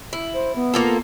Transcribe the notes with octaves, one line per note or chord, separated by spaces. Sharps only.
E4
C5
B3
A#3 F4 A4